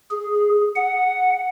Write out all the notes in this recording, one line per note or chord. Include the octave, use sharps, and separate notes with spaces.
G#4
F#5